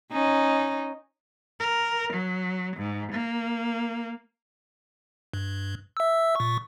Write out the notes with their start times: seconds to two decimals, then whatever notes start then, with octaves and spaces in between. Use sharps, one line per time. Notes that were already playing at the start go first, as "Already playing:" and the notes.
0.12 C#4 D#4
1.60 A#4
2.13 F#3
2.77 G#2
3.12 A#3
5.34 G2
5.97 E5 E6
6.36 A#2 C#6